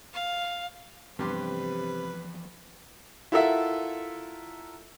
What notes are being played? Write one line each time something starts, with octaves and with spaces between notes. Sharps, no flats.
F5
G2 C3 E3 F3 B3 G4 B4 C6
E4 F4 A4 A#4 E5 F#5